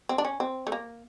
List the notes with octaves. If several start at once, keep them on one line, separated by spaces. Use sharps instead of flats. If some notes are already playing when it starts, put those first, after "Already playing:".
C4
D4
C#4
C4
A3
A#3